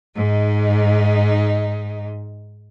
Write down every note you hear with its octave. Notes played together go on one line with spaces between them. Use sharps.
G#2 D#4